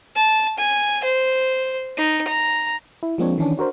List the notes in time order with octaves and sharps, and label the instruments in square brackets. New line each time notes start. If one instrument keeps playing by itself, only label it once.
[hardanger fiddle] A5
G#5
C5
D#4
A#5
[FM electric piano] E4
F3 G#3 A#3 C4 D4 C#5
D#3 E3 C#4 D4
D4 F#4 A#4 C5